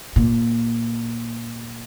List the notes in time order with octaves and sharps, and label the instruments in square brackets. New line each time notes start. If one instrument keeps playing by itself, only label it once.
[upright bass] A#2